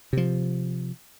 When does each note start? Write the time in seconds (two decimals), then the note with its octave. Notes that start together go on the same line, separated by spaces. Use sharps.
0.13 C3 F3